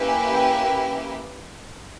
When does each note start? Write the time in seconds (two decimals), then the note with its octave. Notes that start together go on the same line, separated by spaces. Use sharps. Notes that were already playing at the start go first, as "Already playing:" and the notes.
Already playing: A#3 C#4 E4 G4 B4
0.09 G#5
0.35 G5